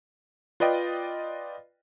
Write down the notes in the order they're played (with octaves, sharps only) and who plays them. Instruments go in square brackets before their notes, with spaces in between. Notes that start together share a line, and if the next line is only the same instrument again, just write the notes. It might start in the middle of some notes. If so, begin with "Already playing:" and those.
[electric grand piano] F4 B4 D5 D#5 G5